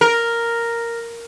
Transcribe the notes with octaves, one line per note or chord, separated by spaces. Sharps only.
A#4